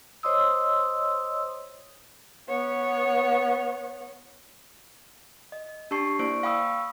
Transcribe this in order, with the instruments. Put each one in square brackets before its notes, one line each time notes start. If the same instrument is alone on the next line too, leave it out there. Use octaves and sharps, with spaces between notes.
[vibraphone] C5 C#5 D#5 C6 D#6 E6
[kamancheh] B3 C#5
[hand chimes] D#5
D4 G4 A5 C#6 C7
A#3 E4 C5 D5 C#6 D7
F5 G5 B5 C#6 D#6 E6